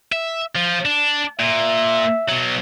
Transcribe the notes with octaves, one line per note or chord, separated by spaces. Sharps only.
E5
F3
D4
A#2 E5
B2 F#3